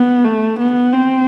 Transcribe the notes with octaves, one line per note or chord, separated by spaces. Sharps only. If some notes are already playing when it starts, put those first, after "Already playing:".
Already playing: B3
A3
B3
C4